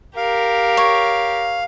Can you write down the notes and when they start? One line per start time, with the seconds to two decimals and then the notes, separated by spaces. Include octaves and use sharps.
0.17 G4 A#4 F5
0.77 C#5